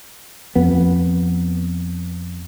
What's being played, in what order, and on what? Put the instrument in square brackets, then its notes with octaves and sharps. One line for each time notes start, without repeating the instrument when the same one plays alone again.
[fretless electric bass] F2 B3